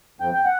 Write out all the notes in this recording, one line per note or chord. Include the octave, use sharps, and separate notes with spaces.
F2 G5
G5
F#5